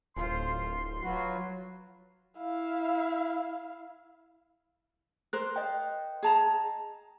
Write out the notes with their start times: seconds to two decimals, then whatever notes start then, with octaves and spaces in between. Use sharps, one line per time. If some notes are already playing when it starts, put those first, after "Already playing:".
0.17 D1 F4 C5 C6
1.03 F#3 F4 F#4 B4
2.38 E4 F5
5.33 A#4 C5 F#6
5.56 D#5 G5
6.23 G#4 A5 A#5